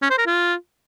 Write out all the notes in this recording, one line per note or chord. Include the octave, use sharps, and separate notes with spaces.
C#4
C5
A#4
F4